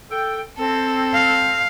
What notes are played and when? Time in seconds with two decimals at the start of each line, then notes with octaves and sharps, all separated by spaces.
0.10 A4 G5
0.58 C4 A4
1.14 F5